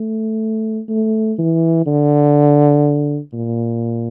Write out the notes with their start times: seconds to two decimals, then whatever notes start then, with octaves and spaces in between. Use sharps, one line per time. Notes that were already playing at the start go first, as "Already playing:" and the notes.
Already playing: A3
0.89 A3
1.38 E3
1.86 D3
3.33 A#2